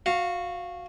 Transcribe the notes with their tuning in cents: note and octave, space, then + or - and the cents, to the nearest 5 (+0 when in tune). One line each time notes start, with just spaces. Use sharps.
F#4 -15 F5 +0